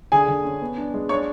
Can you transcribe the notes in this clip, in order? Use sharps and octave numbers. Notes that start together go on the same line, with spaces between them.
D3 G#4 G#5
D3
C#4
B3
D4
G#3
D4 C#5 C#6